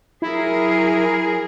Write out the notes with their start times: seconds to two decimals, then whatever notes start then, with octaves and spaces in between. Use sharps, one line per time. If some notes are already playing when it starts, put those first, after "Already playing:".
0.22 F#3 E4 G#4 A#4